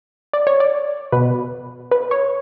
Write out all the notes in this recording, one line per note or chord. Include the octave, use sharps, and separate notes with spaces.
D5
C#5
D5
B2 B4
B4
C#5